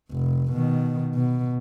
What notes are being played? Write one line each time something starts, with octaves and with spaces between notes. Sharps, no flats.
F1
B2 D#3
B2